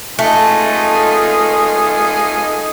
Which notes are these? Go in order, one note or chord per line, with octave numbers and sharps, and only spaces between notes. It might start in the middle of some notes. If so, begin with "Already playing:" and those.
A3 D#4 F4 G#5